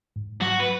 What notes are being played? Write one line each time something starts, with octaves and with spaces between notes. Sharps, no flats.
G#2
F#3 F#4
B4